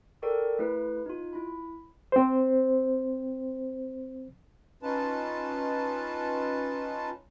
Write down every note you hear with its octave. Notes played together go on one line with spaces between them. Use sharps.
A4 A#4 D5 G5 C#6
A3 E4 B4
D#4 F4
E4 B5
C4 C5
C#4 D#4 F4 B4 A5